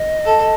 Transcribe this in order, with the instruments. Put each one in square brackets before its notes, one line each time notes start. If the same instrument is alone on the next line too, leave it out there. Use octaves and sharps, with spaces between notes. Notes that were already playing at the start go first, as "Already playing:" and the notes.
Already playing: [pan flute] D#5
[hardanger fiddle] A4